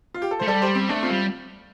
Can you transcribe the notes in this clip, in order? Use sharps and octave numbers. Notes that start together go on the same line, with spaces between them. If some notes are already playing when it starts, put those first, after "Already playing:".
F4
G4
A4
A3 C5
G3 A4 D5
G4 C5
C4
A3 D4
C4 F4
G3